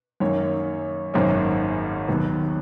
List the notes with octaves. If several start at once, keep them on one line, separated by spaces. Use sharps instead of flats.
F#2 D#3 F#3 A#3 C#4 C#5
G#1 F#2 D#3 A#3 C#4
D#2 D#3 F#3 B3